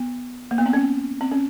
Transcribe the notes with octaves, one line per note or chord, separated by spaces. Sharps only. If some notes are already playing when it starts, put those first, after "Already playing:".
Already playing: B3
A#3
B3
C4
C#4
C4
C#4